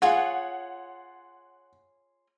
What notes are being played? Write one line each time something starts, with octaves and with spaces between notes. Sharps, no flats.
F4 G#4 C#5 F#5